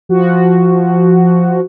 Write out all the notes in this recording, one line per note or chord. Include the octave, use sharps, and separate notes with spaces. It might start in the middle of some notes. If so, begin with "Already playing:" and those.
F3 F#4